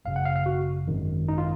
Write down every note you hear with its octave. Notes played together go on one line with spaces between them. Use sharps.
G#1 F#2 C#3 F5
F#5
F5
F5
F#4
G#1 F#2 D#3
D#4
F4